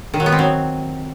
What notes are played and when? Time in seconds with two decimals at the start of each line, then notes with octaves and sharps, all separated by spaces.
0.14 D#3
0.20 F#3
0.26 B3
0.32 C4
0.39 F#3